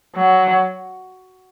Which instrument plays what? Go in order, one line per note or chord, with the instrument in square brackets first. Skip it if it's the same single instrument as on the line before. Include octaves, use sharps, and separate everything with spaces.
[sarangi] F#3